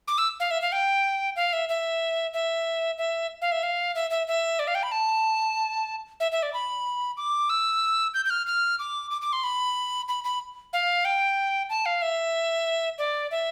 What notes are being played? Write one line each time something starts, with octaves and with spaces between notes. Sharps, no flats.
D6
E6
F5
E5
F5
G5
F5
E5
E5
E5
E5
F5
E5
F5
E5
E5
E5
D5
F5
G5
B5
A5
E5
E5
D5
B5
D6
E6
G6
G6
F6
F6
D6
D6
D6
C6
B5
B5
B5
F5
G5
A5
F5
E5
D5
E5